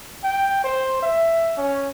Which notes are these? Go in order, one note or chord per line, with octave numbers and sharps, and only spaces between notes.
G5
C5
E5
C#4